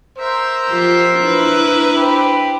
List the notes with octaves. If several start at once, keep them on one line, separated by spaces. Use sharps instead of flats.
A#4 C5 E5
F3 F4 G4
D4 E4 B4
G4 C5 B5